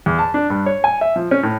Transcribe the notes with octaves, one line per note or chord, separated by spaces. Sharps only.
E2
A5
D4
G2
C#5
G#5
E5
F3
C#4
A2